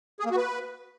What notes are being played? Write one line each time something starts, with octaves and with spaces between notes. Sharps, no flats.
G#4
A#3
F#4
B4